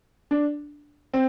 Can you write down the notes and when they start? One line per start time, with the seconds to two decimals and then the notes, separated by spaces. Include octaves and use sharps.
0.31 D4
1.14 C4